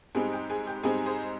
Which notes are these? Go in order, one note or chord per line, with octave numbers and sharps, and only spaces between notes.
G#2 G3 C4 D#4 G#4
G4
G#4
G4
G#2 G3 C4 D#4 G#4
G#4 C5